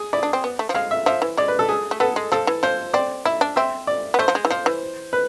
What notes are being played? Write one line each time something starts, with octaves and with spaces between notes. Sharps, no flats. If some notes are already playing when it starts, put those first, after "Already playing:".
Already playing: G#4
E4 D5
D4
C4
B3
A3
F3
G#3 F5
E5
F3 E5
E3
G#3 D5
B4
A4
G#4
A3
B3 A4
G#3
F3 A4
E3
F3 C5
C4 D5
E4 E5
D4
C4 E5
D5
B3
A3 C5
F3
G#3
E3
F3 C5
E3
B4